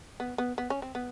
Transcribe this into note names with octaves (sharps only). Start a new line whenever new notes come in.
B3
B3
B3
C#4
C4
B3